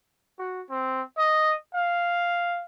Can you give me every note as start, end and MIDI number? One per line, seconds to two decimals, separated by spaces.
0.38 0.62 66
0.70 1.02 60
1.18 1.54 75
1.74 2.65 77